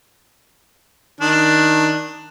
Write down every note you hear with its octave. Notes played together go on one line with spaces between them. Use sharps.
D#3 D4